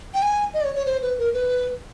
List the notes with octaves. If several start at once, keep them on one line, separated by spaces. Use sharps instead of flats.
G5
G#5
D#5
D5
C#5
C#5
C5
B4
A#4
B4